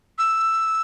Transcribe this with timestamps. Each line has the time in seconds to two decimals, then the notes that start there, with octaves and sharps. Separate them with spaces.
0.18 E6